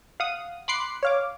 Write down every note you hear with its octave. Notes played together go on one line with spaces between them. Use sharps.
F5 F#5 D#6
B5 C6 D6 F#6 C7 C#7
C#5 F5 D6